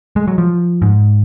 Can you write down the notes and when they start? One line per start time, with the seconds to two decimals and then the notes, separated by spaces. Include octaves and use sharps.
0.16 G#3
0.28 F#3
0.38 F3
0.82 G#2